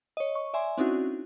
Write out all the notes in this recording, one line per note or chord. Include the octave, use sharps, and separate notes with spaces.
C#5 D#5
C#6
D5 E5 G#5 C6
C4 C#4 D#4 E4 F#4